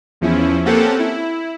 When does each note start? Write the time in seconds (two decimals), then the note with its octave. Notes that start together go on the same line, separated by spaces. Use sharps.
0.21 E2 F3 C#4 E4
0.65 A#3 C4 C#4 G4 A4 F#5
0.99 E4